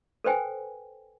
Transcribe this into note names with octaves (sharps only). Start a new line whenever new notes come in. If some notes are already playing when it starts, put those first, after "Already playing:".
A4 B4 C5 G5 G#5